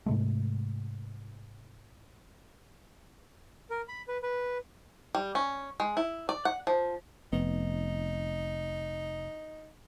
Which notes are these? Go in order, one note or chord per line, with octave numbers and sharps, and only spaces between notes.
G#2 C3 G#3 A3
A#4
B5
B4
B4
G3
C#4
G#3
E4
D5
F#5
F3
F1 B3 D#4